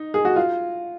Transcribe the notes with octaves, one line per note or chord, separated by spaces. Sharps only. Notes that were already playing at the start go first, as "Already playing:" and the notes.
Already playing: D#4
G#4
F#4
F4